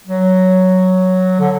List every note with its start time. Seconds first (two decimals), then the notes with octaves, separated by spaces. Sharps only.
0.07 F#3
1.40 D3